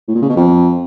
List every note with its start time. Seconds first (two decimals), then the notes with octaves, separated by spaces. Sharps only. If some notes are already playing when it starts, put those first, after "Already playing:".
0.08 A2
0.15 A#2
0.22 C#3
0.29 B2
0.36 F2